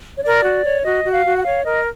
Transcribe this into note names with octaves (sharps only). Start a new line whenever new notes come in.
C#5
A#4 D5
F#4
C#5
F#4 D#5
F#4
F5
F#4
F#5
C#5 F5
A#4 D#5